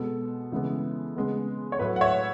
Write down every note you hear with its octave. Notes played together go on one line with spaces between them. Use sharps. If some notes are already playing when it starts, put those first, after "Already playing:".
Already playing: B2 G#3 B3 A4
C#3 E3 G#3 B3
C#3 G#3 B3
C#5
A2 F#3 A3 B4
F#5
C#5 E5